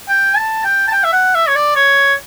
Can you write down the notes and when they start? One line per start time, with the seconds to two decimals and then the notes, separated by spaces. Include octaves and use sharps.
0.09 G5
0.37 A5
0.64 G5
0.88 A5
0.92 G5
1.04 E5
1.13 F#5
1.35 E5
1.48 C#5
1.55 D5
1.76 C#5